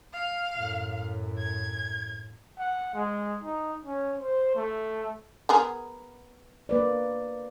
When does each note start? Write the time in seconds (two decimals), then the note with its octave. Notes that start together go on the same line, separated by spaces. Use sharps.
0.13 F5
0.55 F#2 A2
1.38 G#6
2.59 F#5
2.94 G#3
3.43 D#4
3.85 C#4
4.18 C5
4.55 A3
5.49 B3 G#4 A#4
6.69 A#3 B4 D5